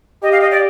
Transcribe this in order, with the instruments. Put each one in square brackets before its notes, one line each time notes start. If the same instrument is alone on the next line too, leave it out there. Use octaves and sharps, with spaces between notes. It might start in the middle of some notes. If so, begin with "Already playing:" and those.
[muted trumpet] G4 [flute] D#5
[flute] F5
D#5
D5